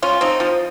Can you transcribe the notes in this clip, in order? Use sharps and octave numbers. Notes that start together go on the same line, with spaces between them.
C#4 F4
C4 D#4
F3